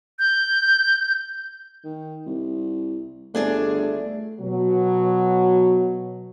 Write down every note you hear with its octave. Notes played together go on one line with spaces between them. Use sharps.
G6
D#3
C2
G1 A3 D4 G#4 D5
B2 F#3